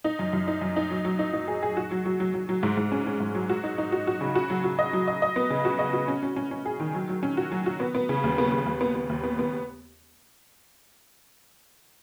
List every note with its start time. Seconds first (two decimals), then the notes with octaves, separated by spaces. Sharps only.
0.04 D#4
0.19 F#2
0.33 F#2
0.47 D#4
0.61 F#2
0.76 D#4
0.91 F#3
1.05 F#3
1.19 D#4
1.33 D#4
1.48 G#4
1.63 G#4
1.77 F#4
1.91 F#3
2.06 F#3
2.20 F#3
2.34 F#3
2.49 F#3
2.63 G#2
2.77 G#2
2.92 C#4
3.06 C#4
3.20 G#2
3.35 F#3
3.49 F#4
3.64 D#4
3.78 D#4
3.92 F#4
4.07 F#4
4.21 C#3
4.35 F#4
4.50 F#3
4.64 F#4
4.79 D#5
4.93 F#3
5.08 D#5
5.22 D#5
5.36 B3
5.50 C#3
5.65 F#4
5.79 D#5
5.93 F#4
6.08 C#4
6.23 C#4
6.36 C#4
6.51 C#4
6.65 G#4
6.80 D#3
6.94 F#3
7.09 F#3
7.23 C#4
7.37 F#4
7.52 F#3
7.66 F#4
7.80 B3
7.95 B3
8.09 C#3
8.24 D#2
8.38 B3
8.52 B3
8.66 D#2
8.81 B3
8.95 B3
9.09 D#2
9.23 B3
9.39 B3